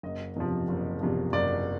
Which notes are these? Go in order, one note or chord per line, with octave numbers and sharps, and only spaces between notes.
F#1 D#5
E2 C3 F3
F#1
E2 C3 F3
F#1 D5